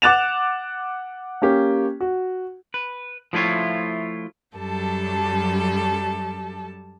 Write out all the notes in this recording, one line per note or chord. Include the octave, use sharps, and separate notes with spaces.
F#5 D6 F#6 A6 E7 F7
A#3 C#4 G4
F#4
B4
F3 A3 E4 F4 C#5
F#2 F#3 G3 G4 A4 A5